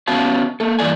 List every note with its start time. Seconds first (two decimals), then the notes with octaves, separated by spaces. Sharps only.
0.08 B3 C#4 F#4 E5 F5 A5
0.60 A#3 A4
0.79 G2 E3 A#3 D5 G#5